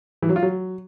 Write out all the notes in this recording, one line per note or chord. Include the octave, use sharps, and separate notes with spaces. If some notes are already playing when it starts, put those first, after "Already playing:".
E3
F#3
F4
F#3